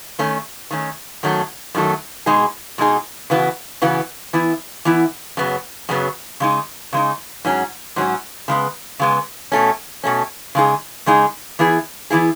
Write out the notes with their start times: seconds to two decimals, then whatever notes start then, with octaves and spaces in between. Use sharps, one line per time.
0.19 D#3 A3 C#4
0.71 D#3 A3 C#4
1.23 F#2 D#3 F#3 A3
1.75 F#2 D#3 F#3 A3
2.26 B2 G#3 D#4 G#4
2.78 B2 G#3 D#4 G#4
3.30 C#3 E3 B3 F#4
3.82 C#3 E3 B3 F#4
4.33 E3 B3 E4
4.85 E3 B3 E4
5.37 F#2 C#3 F#3 B3
5.89 F#2 C#3 F#3 B3
6.40 C#3 G#3 D#4
6.93 C#3 G#3 D#4
7.45 G#2 F#3 C#4
7.96 G#2 F#3 C#4
8.48 C#3 G#3 B3
8.99 C#3 G#3 B3
9.52 B2 A3 C#4
10.04 B2 A3 C#4
10.55 C#3 G#3 D#4 G#4
11.06 C#3 G#3 D#4 G#4
11.59 E3 B3 E4 G#4
12.10 E3 B3 E4 G#4